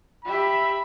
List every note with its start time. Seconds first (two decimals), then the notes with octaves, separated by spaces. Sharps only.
0.25 G4 E5 B5